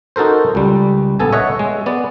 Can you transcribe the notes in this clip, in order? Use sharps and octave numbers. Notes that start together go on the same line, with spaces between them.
D#4 F#4 A4 A#4 C5
C#2 G3
A#1 B3 A4 G#5
C#5 D#5 E5 F#5
G#3
B3 D5